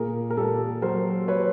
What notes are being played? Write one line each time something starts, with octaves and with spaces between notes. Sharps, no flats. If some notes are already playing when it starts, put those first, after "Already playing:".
Already playing: A#2 G#4 A#4
A#4
A#2 G4 A4
F#3 A#4 C5
F#3 B4 C#5